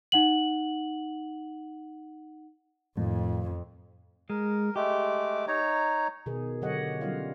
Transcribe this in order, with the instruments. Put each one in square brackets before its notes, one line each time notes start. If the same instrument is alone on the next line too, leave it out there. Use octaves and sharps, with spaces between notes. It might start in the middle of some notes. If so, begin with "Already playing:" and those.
[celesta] D#4 F#5 F#7
[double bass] F2 [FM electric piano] A2 [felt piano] D#3 F3
[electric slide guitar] G#3 [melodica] A#4
[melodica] G#3 A3 D6 [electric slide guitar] G4
[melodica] D#4 C#5 A#5
[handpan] B2 D#3 G#4
D3 F#3 G4 C#5 D#5 F#5
F#3 G3 C#4 F4 F5